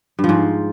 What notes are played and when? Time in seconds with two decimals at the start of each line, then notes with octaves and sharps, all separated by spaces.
0.19 G2
0.24 F3
0.29 G#2